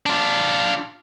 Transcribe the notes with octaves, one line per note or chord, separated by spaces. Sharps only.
D4 F4